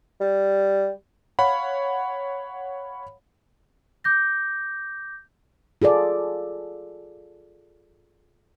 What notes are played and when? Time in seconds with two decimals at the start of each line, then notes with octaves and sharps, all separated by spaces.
0.20 G3
1.39 C#5 F5 F#5 B5
4.04 D6 G6 A#6
5.82 F4 G#4 A4 D5